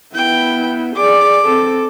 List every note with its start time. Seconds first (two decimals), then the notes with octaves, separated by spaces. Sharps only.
0.15 B3 E4 G5
0.96 G#4 D5 D6
1.45 C4 A4